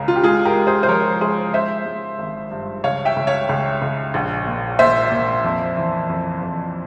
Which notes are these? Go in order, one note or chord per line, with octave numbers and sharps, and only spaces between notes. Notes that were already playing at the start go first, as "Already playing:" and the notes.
Already playing: C#2 C#3 A#4
F4
G4
G#3 F4 G#4
G4 A#4
G#3
G#4 C5
C5
F3 A#4 C#5
G#3 G#4 C5
G#3 C5 E5
G#3
G#1
G2
C#2 C#5 F5
E5 G5
C#2
C#5 F5
C#2
C#2
A#1
A#2
A#2 C5 E5
A#2
F2
E3
F2
F2